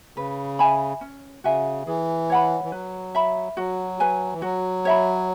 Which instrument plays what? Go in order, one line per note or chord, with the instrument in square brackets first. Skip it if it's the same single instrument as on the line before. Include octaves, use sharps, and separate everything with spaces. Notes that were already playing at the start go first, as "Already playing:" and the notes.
[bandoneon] C#3 [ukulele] B4
[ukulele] E5 G#5 B5
C#4
[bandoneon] C#3 [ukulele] F#4 E5 G#5
[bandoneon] E3 [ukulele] G#4
[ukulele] C#5 F#5 B5
[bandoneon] E3
[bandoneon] F#3 [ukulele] B4
[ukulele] E5 B5
[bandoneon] F#3 [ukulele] F#4
[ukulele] B4 G#5
[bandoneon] E3
[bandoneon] F#3 [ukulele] F#4
[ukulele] C#5 E5 B5